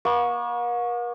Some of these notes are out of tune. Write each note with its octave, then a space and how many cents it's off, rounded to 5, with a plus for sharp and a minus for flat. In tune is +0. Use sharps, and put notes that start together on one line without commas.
A#3 +45 C#6 +0